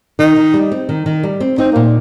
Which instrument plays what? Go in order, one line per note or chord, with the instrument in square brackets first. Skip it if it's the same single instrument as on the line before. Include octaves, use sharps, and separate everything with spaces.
[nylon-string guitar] D#3 [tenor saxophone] D#4
[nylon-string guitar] D#3
G3
C4
D#3
D#3
G3
C4
[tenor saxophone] C4 [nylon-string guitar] D#4
[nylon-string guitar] A#2 [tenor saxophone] A#3